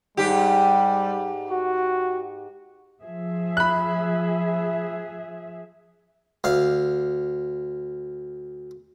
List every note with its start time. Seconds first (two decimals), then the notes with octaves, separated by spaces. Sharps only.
0.17 G#2 G3 G4
1.50 F#4
3.02 F3 G#4 E5
3.57 B5 F#6
6.44 D2 F5